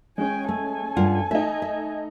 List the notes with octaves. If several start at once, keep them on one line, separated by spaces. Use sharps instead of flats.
G#3 C#4 G5 G#5
A3 A4 G#5
G2 F4 F#5
A3 D#4 E5
E5